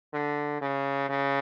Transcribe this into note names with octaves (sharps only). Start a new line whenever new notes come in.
D3
C#3
C#3